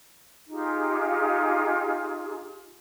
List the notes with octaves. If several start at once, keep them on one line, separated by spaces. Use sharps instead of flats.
D#4 F4 G4 G#4